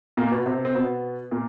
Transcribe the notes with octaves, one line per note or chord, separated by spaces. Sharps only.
A#2 A#3
B2 B3
C3 C4
C4
B2 B3
A#2 A#3